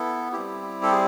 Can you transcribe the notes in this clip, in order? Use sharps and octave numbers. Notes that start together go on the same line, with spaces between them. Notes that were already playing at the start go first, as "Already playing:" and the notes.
Already playing: B3 E4 A4
G3 C4 E4 G4
A4
G#4